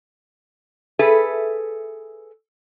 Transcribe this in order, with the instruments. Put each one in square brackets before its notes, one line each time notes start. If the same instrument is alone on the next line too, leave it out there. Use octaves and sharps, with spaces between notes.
[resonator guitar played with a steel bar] G#4 A4 B4 E5